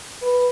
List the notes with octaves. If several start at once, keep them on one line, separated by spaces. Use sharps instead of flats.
B4